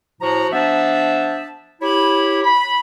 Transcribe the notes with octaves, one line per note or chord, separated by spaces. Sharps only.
A2 F3 F#4 A#5
F3 B3 D4 E5 A5
E4 G4 C#5 B5
B5